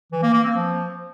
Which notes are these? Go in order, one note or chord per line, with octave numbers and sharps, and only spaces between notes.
E3
A#3
A#3
C4
F3